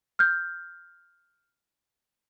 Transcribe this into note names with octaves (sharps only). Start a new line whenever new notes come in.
F6 G6